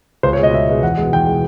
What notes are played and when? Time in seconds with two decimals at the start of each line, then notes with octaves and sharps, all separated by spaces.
0.23 C#2 C5
0.33 C#5
0.39 B2 G#3 D#5
0.54 C#2 E5
0.68 B2 G#3
0.82 E2 F#5
0.97 B2 G#3
1.13 E2 G5
1.27 B2 G#3